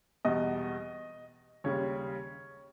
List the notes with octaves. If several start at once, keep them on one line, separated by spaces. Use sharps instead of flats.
E2 B2 G3 D#5
D#2 C#3 G3 C#5